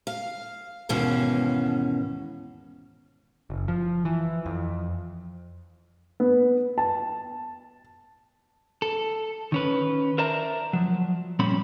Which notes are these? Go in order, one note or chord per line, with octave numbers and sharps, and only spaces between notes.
F5
D#2 G#2 B2 E3 C#4 F5
F#1
F3
E3
F2
B3
A5
A4
D#3 C#4 B4
A#4 C5 D5 E5 A5 A#5
F3 F#3
A#2 G3 C4 C#4 B5